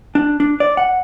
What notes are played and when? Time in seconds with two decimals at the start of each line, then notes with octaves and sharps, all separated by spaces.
0.15 D4
0.40 D4
0.60 D5
0.77 F#5